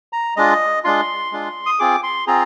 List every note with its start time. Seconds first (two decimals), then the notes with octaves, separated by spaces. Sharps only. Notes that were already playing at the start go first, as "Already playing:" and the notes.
0.13 A#5
0.36 G#3 D4 F4 D#5
0.84 G#3 D4 F4 C6
1.32 G#3 D4 F4
1.66 D#6
1.79 C4 F4 G#4 D6
2.03 C6
2.27 C4 F4 G#4 A#5